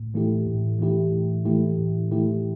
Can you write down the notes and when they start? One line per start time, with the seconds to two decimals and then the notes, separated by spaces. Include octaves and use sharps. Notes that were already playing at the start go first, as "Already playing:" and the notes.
Already playing: A2
0.14 E3 A3 E4 G4
0.47 A2
0.79 E3 A3 E4 G4
1.12 A2
1.45 E3 A3 E4 G4
1.79 A2
2.11 E3 A3 E4 G4